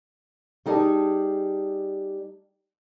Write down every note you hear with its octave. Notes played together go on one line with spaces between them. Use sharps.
G3 D#4 G#4 D5 A5